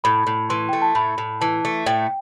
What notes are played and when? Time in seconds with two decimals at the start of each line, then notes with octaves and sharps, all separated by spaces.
0.04 A2 B5
0.27 A2
0.49 E3 C6
0.69 A3 G5
0.82 A5
0.95 A2 B5
1.18 A2
1.41 E3 A5
1.65 A3
1.86 A2 G5